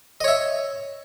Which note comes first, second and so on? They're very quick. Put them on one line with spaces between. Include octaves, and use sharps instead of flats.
D#5 C#5 E5